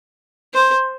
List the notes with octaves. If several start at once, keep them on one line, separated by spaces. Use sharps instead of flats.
C5